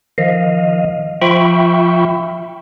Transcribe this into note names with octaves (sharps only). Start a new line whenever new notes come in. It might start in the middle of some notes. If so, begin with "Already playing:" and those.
D#3 F3 D#5 F5
F3 F4 E5 G5 B5 C#6